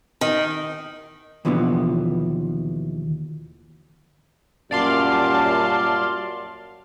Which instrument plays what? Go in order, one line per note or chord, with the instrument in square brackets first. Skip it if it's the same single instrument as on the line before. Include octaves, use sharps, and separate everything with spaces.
[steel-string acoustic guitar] D#3
[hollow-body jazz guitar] D#2 B2 D3 E3 F3 B3
[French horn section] F#2 A#2 [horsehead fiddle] G3 A5 [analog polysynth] D5 F5 C6